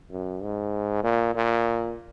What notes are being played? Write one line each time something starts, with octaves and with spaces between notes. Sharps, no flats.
F#2
G#2
A#2
A#2